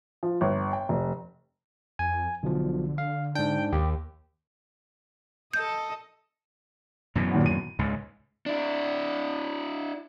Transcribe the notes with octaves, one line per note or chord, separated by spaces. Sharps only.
F3
G1
G5
F1
F2 G#5
B1 B2 D3 F3
F5
G#2 D4 G5
D#2 G4
A4 D#5 G6
F#2 B2 E3
A#2 D#3 B3
D#7
C#2 G#2
D4 E4